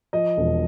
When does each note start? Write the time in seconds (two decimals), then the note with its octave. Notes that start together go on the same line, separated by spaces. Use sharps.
0.13 F3 D#5
0.37 E1